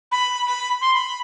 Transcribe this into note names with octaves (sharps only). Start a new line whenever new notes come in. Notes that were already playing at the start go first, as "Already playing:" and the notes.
B5
B5
C6
B5